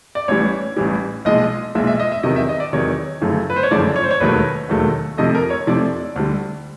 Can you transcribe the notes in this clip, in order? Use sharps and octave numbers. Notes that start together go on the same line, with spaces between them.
D5
A1 A2 E3 G3 C#5
A1 A2 E3 G3
B1 A#2 F3 G#3 D#5
B1 A#2 F3 G#3 E5
E5
D#5
E5
E2 C3 D#3 F#3 D#5
E5
D#5
D5
E2 C3 D#3 F#3 C#5
G1 F#2 C#3 F3 A3
B4
C5
C#5
G1 F#2 C#3 F3 A3 D5
C#5
C5
C#5
E1 D#2 D#3 F#3 A3 B4
E1 D#2 D#3 F#3 A3
F2 C3 F3 A3 D#5
A#4
C#5
F2 C3 F3 A3 D5
D2 D3 G3